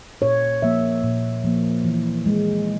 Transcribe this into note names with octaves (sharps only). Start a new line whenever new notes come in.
A#2 C#5
F3 A#3 E5
A#2
F3 A#3
E3
G#3